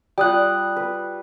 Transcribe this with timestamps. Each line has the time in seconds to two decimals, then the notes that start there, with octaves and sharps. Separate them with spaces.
0.18 G3 F4 G5 D#6 F#6
0.76 B4